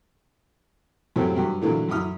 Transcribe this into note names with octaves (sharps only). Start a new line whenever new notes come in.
F#2 A2 C3 F#3 A3 C4
G2 F#3
A#2 D3 E3 F#3 A3
F#2 F#3 E4 D#6 F6